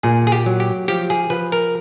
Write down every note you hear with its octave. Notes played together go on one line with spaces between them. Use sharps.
A#2 G#4
G#4
G4
F#3
G4
F3 G4
G#4
F3 B4
A#4